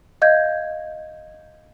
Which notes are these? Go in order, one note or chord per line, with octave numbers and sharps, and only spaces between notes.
D#5 F5 G6 G#6